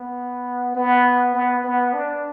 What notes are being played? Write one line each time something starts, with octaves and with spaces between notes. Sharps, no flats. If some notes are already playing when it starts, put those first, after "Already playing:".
Already playing: B3
B3
B3
B3
D4